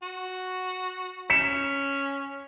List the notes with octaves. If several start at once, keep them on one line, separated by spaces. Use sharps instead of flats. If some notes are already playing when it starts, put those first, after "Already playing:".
F#4
C#4 B6 C#7 E7